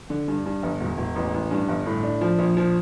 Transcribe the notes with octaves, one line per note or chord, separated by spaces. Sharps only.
D3
G2
G2
G1
E1
E1
A1
A1
G2
G1
A2
D4
F3
A#1
F3